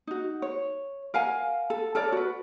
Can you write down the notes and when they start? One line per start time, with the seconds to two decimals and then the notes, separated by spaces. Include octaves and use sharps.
0.07 D#4 F#4
0.42 C#5
1.14 A#4 F5 F#5 G#5
1.70 A4
1.95 A4 A#4 C#5 D5
2.12 F#4 B4